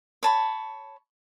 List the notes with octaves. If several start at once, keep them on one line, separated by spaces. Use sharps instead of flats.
C#5 A5 B5